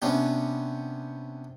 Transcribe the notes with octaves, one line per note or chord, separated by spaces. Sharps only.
C3 B3 C#4 D4 G4